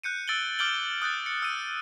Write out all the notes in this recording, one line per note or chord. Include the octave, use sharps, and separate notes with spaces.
F#6 G6 C#7 D#7
E6 A6 D7 F#7 G7
D6 F6 G6 D7 F#7 G7
D#6 F#6 G6 A6
C#7
E6 D#7